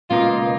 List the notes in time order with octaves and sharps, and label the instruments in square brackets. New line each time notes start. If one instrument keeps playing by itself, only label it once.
[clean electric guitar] C#2 B2 A#3 D#4 [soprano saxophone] F4